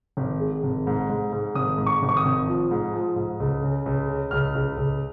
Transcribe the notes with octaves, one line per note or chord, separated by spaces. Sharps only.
G#1
G#3
G#1
G#2
G#2
G#2
G#1 D#6
G#2
C#6
G#1
C#6
D#6
G#1
F3
G#2
F3
G#2
C#2
C#3
C#2
C#3
C#2 F6
C#2
C#2